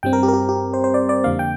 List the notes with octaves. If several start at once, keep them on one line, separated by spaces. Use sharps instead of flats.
G2 G3 C4 G5
A#4
G4
A#4
G4
G4
C5
C5
D5
D5
F2 D3 A#3 F5
G5